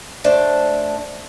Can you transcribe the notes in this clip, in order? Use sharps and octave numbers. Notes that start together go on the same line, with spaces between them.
A3 D4 C5